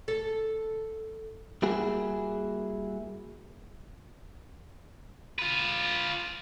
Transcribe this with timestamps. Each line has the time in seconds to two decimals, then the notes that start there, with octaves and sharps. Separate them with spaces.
0.08 A4
1.62 G3 A#3 E4 F#4 G#4
5.39 F4 B4